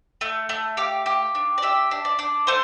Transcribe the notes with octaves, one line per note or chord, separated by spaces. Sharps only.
A3
A3
G4 F5
G4
D4
D5
G4 E5
D4
D5
D4
A3 C5